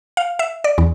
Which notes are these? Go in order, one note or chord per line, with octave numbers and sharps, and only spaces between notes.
F5
E5
D5
E2